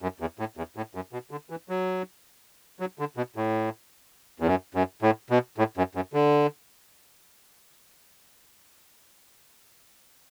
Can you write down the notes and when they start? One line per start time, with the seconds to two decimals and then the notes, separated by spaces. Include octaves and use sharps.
0.02 F#2
0.20 E2
0.39 A2
0.57 E2
0.76 A2
0.95 F#2
1.13 B2
1.31 D3
1.50 E3
1.69 F#3
2.80 F#3
2.99 D3
3.17 B2
3.36 A2
4.40 E2
4.47 F#2
4.75 F#2
5.02 A2
5.30 B2
5.58 A2
5.77 F#2
5.95 F#2
6.13 D3